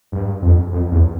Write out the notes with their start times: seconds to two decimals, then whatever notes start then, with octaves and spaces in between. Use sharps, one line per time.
0.12 G2
0.42 F2
0.72 F2
0.92 E2